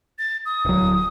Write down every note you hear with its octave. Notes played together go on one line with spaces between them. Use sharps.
A6
D#6
D1 F#3